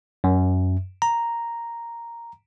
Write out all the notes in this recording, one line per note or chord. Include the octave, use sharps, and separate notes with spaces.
F#2
A#5